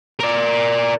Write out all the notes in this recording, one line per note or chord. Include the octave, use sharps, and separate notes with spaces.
A#4 D5